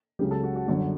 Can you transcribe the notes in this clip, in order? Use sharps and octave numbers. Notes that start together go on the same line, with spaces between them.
C#2 C#3 F#3 G4
A4
F#4
F#4
G1 F#2 D3 F#4